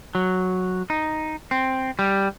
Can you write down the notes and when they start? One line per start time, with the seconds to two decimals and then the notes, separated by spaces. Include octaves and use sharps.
0.15 F#3
0.90 D#4
1.51 C4
1.99 G3